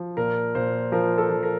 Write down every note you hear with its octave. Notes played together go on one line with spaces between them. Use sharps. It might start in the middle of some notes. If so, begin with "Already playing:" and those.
Already playing: F3
A#2 A#4
A#2 C5
F3 A#4
A4
F3
A#4